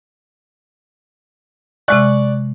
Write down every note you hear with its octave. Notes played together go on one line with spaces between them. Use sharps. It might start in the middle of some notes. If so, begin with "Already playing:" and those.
C3 G#3 D5 C#6 F6 F#6